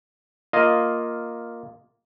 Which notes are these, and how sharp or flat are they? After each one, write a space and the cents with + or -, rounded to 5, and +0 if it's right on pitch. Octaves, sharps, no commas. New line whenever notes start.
A#3 +0 F4 +0 D#5 +0